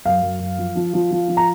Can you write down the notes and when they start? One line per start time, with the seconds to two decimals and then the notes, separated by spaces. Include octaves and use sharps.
0.05 F#2 F5
0.22 F#2
0.40 F#2
0.58 F3
0.75 F3
0.94 F3
1.11 F3
1.28 F3
1.37 A#5